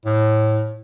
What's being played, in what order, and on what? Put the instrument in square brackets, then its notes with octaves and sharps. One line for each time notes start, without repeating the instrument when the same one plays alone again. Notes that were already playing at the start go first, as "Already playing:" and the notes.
[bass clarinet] A2